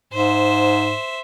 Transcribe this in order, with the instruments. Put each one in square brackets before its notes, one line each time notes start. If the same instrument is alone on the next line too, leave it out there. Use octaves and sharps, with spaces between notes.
[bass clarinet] G#2 [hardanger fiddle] C5 E5